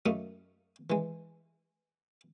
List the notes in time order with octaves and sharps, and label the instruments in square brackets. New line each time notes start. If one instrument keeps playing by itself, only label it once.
[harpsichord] F#2 A3 A#3 D#4
E3 G#3